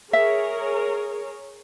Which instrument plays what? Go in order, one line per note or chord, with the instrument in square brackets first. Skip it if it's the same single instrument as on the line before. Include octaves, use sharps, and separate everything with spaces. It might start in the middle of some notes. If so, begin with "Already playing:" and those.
[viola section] G#4 A#4 C#5 [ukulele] E5